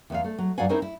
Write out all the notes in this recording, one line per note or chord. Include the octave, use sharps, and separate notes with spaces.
E2 B3 F5
A3
F#3
G2 F#3 D5 F5 F#5 G#5
C4 C#4 D#4 E4 A#4 C5
E4